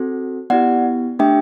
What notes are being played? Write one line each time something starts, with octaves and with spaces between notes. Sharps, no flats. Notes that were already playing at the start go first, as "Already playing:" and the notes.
Already playing: C4 F#4 A4
B3 E4 G4 D5 F#5
A3 D4 G4 E5 G5